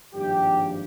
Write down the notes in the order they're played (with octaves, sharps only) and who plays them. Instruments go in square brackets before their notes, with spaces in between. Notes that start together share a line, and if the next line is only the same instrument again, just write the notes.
[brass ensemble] G#1 G2 F3 A#3 G4